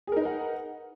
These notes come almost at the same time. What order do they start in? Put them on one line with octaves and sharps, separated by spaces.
G#4 A#4 D#4 B4 F#5